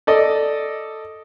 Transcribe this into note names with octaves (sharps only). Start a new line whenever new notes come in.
A4 D5 D#5